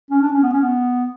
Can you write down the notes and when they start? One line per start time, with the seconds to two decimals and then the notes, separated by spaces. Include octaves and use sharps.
0.10 C#4
0.22 D4
0.32 C#4
0.43 B3
0.53 C#4
0.62 B3